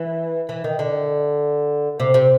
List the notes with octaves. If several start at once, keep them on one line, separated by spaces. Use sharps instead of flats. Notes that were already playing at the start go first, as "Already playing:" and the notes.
Already playing: E3
E3
D#3
D3
C3
C3